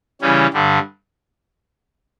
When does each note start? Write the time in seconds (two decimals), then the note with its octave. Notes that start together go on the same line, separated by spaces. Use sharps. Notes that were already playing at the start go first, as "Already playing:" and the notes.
0.21 C#3 E3 G3 C#4
0.53 G2 D3 G3